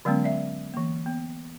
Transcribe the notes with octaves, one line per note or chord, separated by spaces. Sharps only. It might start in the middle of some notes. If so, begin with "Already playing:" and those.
D3 F#3 G#3 B3 C#4
D5 E5
E3 A#3
B3